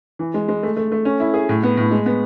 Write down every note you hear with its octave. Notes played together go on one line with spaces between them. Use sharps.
E3
G#3
G#3
A3
A3
A3
C#4
E4
G#4
A2
B3
A2
G#3
B3